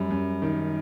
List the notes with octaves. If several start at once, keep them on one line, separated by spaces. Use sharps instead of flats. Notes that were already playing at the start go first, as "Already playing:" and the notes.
Already playing: F#2 G3
F#2
D#3